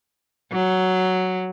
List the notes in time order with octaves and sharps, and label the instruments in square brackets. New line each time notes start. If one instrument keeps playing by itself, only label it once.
[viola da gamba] F#3